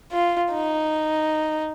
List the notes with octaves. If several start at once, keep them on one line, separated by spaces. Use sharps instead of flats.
F4
D#4